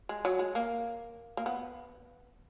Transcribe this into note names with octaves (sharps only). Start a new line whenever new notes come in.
G#3
F#3
G#3
A#3
A#3
B3